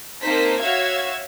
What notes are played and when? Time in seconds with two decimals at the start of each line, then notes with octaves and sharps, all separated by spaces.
0.22 A#3 C4 D#4 C5 A5 B6
0.61 F#4 C#5 E5 F5 E6 G#6